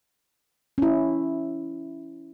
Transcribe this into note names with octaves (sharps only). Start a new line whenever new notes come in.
C#4 E4